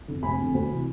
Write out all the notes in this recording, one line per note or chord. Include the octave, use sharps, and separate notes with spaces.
F2 D3
F1 G#5 B5
F2 D3
D2
C3 E3